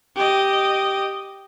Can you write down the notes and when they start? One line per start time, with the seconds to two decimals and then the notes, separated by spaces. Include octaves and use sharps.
0.16 G4 D#5